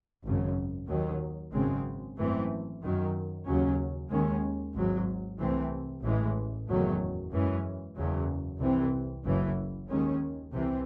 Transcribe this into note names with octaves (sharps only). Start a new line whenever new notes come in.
G#1 F#2 C#3
D#2 D#3 F#3
G#1 F#2 C#3 G#3 C4
G#1 F#2 E3 A3 C4
F#2 D#3 F#3
D#2 C#3 F#3 C#4
D#2 D#3 G#3 C#4
G#1 G#2 F#3
C2 C3 E3 A3 C4
A1 A2 E3 G#3
F#1 E2 D#3 F#3 A3
F#2 E3 G#3 C#4
F#1 E2 C#3 F#3
C2 C3 E3 C4
F#1 F#2 C#3 E3
D#2 D#3 G#3 C#4
C2 C3 E3 C4